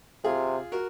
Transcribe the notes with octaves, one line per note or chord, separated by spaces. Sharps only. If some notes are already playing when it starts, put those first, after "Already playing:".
C3 F4 G#4
F#4 A#4